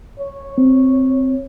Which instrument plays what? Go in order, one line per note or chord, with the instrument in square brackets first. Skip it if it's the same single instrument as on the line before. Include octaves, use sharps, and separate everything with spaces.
[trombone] C#5
[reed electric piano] C4